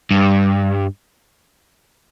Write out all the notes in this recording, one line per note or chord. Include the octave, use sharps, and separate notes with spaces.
G2